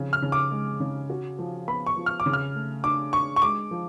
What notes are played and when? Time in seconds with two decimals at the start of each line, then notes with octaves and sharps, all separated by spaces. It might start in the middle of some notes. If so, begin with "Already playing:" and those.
Already playing: C#3 F3
0.13 F6
0.22 C#3
0.32 D6
0.51 G#3
0.80 C#3
1.10 F#4
1.39 F3
1.67 B3 B5
1.86 C#6
1.97 F3
2.06 F6
2.20 D6
2.26 C#3
2.33 F6
2.55 A3
2.84 D4 D6
3.13 D4 C#6
3.36 C#6
3.42 G#3 D6
3.71 F3